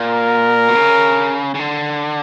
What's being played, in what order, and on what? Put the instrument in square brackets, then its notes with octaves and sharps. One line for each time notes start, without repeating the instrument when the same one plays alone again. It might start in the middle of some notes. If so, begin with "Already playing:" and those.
Already playing: [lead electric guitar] A#2 [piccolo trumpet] A#4
[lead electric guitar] B2
C#3
C#3
D3